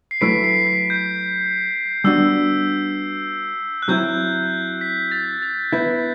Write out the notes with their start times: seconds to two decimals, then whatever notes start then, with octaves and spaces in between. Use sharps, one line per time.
0.11 C7
0.21 F#3 A3 E4 B4 B6 D7
0.44 C7
0.67 B6
0.90 G6
2.04 G3 B3 D4 F#4 E6
3.82 F#6
3.88 F#3 C4 E4 G6
4.81 B6
5.12 A6
5.42 A6
5.73 B3 E4 B4 G6